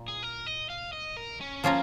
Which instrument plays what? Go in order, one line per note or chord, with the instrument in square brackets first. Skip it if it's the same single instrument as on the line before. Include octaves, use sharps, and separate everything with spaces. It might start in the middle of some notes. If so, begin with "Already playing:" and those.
Already playing: [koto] A#2
[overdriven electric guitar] G#4
A#4
D#5
F5
D#5
A#4
C#4
[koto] F3 C#4 F4 A#4 [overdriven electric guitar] A#3